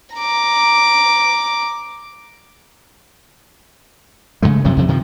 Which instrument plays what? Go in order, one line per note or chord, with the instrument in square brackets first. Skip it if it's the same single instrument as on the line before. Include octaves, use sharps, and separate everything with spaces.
[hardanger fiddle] A#5 D6
[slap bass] C#3 E3 G#3 A3
F#2 C3 F3 F#3
F2 C3 F3
C3 D#3 F3